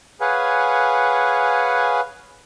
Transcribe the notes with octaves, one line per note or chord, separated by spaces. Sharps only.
G#4 B4 C#5 F5 F#5 G#5